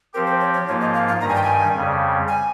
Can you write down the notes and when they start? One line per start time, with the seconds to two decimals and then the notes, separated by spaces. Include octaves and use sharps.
0.14 F3 C4 G4 A#4
0.27 C5
0.40 C#5
0.54 C#5
0.67 G#2 F3 A#3 F4 C#5
0.81 D#5
0.94 F5
1.08 F5
1.21 G2 D#3 G3 A#5
1.28 G#5
1.35 G5
1.43 G#5
1.75 F2 C#3 G3
2.28 G#5